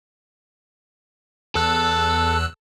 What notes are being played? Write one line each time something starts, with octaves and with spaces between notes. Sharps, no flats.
E2 A4 E6 F#6